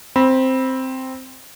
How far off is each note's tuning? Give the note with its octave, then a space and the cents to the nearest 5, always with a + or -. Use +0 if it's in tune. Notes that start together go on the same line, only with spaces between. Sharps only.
C4 +0 B5 -20